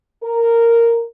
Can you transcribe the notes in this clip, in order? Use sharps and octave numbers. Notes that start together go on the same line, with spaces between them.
A#4